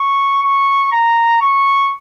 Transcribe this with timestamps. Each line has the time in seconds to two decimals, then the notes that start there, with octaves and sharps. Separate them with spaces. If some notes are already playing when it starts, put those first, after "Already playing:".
Already playing: C#6
0.42 C#6
0.92 A#5
1.41 C#6